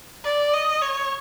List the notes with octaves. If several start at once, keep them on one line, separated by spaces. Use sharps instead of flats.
D5
D#5
C#5